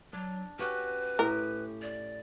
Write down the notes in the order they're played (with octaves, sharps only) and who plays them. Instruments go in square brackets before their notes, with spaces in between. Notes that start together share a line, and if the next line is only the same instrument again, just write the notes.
[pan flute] F#3 [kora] D4
[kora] C#4 F#4 G4 [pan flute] B4
[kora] A2 G4 [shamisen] A#4
[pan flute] D5